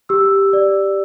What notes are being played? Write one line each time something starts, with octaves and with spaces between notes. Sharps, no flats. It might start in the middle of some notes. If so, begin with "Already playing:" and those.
G4 E6
D5